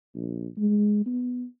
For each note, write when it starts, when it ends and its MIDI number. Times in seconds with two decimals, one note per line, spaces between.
0.14 0.47 34
0.57 1.02 56
1.06 1.45 59